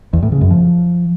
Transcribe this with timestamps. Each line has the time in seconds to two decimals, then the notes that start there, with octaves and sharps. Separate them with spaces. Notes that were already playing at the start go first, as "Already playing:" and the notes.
0.13 E2
0.23 A2
0.32 C#3
0.41 F#2
0.51 F3